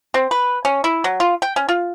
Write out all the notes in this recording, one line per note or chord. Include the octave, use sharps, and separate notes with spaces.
C4
B4
C#4
E4
F#3
F4
G5
C#4
F4